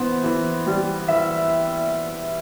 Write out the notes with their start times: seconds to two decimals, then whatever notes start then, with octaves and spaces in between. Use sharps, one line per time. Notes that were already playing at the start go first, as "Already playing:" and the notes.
Already playing: E3 B3 C5
0.24 E3
0.67 G3
1.08 E3 E5